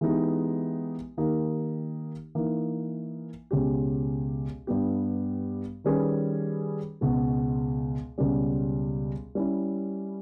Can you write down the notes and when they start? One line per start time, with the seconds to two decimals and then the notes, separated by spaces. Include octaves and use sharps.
0.01 E3 G#3 B3 D#4 G4
1.17 D#3 A#3 D#4 G4
2.35 E3 A#3 D#4
3.51 C#2 B2 G#3 C#4 G4
4.67 G2 G3 B3 G4
5.84 D#3 G3 C#4 G#4 B4
7.01 C#2 B2 G#3
8.18 C#2 B2 G3 C#4
9.35 G3 C#4 E4